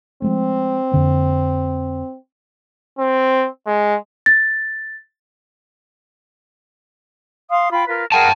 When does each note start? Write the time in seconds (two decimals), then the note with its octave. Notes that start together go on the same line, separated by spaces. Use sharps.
0.22 F3 G#3 A3 C4
0.92 F2 D3 A#3
2.99 C4
3.67 G#3
4.26 A6
7.50 F5 C6 D#6
7.71 F4 G5 B5
7.87 F4 A#4 B4
8.12 G#4 A#4 F#5 G5 A5